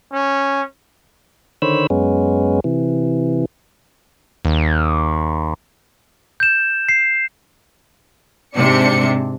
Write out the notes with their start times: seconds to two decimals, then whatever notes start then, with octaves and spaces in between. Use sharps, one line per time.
0.12 C#4
1.62 D3 D#3 C5 C#5 B5 E6
1.90 F#2 G#3 B3 C#4
2.64 C3 E3
4.45 D#2
6.40 G6 E7
6.89 C7
8.55 G#2 C3 D4 C#7